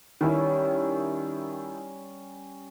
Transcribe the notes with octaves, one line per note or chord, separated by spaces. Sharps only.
D#3 G3 C#4 E4